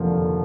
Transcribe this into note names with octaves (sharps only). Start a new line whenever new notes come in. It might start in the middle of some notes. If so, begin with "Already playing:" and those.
Already playing: F1 D#2 D3 F3